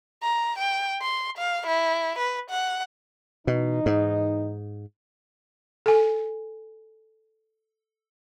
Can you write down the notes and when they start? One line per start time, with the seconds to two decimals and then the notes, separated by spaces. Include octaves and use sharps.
0.23 A#5
0.58 G5
1.02 C6
1.38 F5
1.67 E4
2.18 B4
2.50 F#5
3.47 B2 E3 D#4
3.86 G#2
5.86 A4 G#5